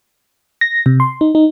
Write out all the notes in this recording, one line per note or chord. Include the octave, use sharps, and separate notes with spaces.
A#6
C3
C6
D#4
D#4